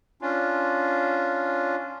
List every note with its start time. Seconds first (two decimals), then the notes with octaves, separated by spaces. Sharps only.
0.21 C#4 D4 F4